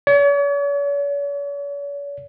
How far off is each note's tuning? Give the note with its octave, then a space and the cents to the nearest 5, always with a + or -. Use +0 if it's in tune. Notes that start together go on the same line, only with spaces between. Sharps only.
C#5 +45